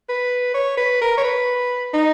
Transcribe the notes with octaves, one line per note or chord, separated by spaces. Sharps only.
B4
C#5
B4
A#4
C#5
B4
D#4